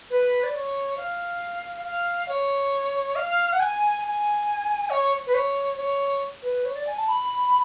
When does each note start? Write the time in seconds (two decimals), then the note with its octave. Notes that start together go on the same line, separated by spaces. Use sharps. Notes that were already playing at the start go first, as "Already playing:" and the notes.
0.10 B4
0.43 D5
0.54 C#5
0.97 F5
1.85 F5
2.28 C#5
3.15 F5
3.52 F#5
3.60 G#5
4.03 G#5
4.89 C#5
5.26 B4
5.34 C#5
5.77 C#5
6.42 B4
6.65 C#5
6.75 D5
6.87 G#5
6.97 A5
7.08 B5